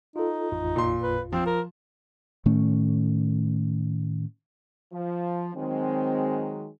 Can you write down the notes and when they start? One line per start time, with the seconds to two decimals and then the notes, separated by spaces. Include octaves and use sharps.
0.16 D#4 F4 A4
0.52 A1 F2 F4
0.76 A#2 C6
1.02 B4
1.33 F3 C4
1.47 A#4
2.46 A2 D#3 A3 C#4
4.93 F3
5.55 D#3 F#3 G#3 C4